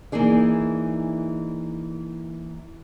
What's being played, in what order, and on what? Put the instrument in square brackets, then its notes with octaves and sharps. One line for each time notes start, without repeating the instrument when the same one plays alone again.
[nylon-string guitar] E3 A#3 D#4 G#4 D5